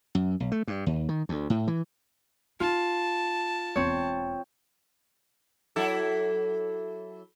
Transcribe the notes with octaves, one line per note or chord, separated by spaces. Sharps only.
F#2
B1
A3
G2
D#2
D#3
D2
A2
E3
D#4 F4 A5
E1 E2 C4 C#5
F#3 E4 A4